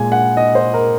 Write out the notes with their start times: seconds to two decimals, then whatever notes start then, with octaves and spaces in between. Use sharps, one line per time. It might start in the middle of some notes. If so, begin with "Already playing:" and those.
Already playing: A#2 G#3 G#5
0.12 F#5
0.37 D#5
0.55 C5
0.74 A#4